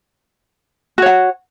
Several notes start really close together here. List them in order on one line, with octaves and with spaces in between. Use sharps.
F#4 C#5 F#5